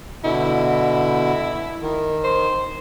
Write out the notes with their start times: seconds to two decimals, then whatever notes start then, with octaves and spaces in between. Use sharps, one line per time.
0.24 B2 D3 E4
1.82 D#3
2.24 C5